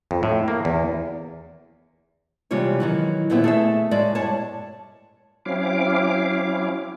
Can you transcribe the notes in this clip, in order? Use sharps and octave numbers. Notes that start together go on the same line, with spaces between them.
F2
A2
A#3
E2
C3 E3 G3 G#3 F4 C#5
D#3 E3 F#3
D#2 A#2 B3 C4 E5
A3 G#4 A4 E5
A2 G#3 D5 E5
G2 C#5 A5
F#3 C4 C#4 E4 F5 D6